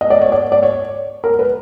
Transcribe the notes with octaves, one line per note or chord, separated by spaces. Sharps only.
D#5
D5
C#5
D5
D5
C#5
A#4
B4